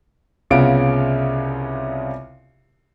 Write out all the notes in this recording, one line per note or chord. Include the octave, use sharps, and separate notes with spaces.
C2 C#3 B3 F4 D7